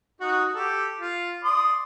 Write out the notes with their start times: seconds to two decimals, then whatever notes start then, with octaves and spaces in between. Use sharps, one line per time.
0.21 D#4 F#4
0.55 G4 A4
1.01 F4
1.44 D5 C6 D#6